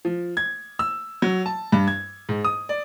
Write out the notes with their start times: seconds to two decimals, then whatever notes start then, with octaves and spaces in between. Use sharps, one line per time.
0.05 F3
0.37 G#6
0.79 E6
1.22 F#3
1.46 A5
1.72 G2
1.88 G#6
2.29 G#2
2.44 D#6
2.69 D5